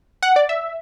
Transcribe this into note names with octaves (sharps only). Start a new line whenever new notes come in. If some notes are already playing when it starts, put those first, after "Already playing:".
F#5
D5
E5